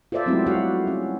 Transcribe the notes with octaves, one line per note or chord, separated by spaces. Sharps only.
F4 A4 C5 D5 E5
F#3 G#3 A3 B3 C4 E4
G3 F#4 F5 F#5
C#4